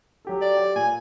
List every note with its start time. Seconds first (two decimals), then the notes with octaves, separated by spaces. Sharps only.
0.25 F#3 G4 A4
0.42 D5
0.57 G4 C#5
0.76 A#2 G#5